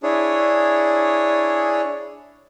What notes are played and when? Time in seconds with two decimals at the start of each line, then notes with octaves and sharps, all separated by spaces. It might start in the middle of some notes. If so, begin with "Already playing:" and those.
0.03 D4 E4 G#4 C#5